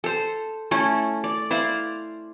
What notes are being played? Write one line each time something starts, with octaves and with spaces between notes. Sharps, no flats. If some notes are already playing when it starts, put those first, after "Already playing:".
A4 C5
A3 C#4 E4 A4
D5
E4 C5 D5 F5